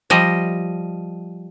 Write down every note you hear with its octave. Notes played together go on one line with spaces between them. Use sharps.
F3 G3 D#5